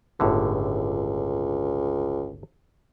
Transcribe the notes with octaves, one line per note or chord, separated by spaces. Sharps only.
G1 C#2 A2 D3